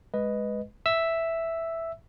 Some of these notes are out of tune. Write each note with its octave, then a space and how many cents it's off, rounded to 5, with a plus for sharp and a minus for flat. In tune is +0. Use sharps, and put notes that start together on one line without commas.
G#3 +0 B4 +0 D#5 +0
E5 +0 E6 +0